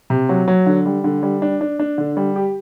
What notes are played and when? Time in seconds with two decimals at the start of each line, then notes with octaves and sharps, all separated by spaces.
0.10 C3
0.29 F#3
0.48 F#3
0.66 D3
0.86 G3
1.04 D3
1.23 G3
1.42 D4
1.61 D4
1.79 D4
1.98 D3
2.17 G3
2.36 G4